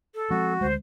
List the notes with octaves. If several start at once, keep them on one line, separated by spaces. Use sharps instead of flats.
A4
F3 G#3 C4 F#4
D2 G#3 C5